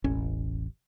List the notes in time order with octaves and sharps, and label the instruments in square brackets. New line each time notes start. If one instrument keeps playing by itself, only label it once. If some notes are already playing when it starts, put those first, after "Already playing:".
[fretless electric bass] E1 A1 C#4